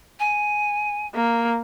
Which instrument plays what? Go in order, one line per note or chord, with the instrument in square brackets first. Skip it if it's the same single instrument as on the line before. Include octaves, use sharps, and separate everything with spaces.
[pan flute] G#5
[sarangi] A#3